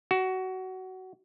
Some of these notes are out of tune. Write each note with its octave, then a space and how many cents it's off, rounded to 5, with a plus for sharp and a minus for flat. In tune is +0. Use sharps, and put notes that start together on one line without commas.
F#4 +20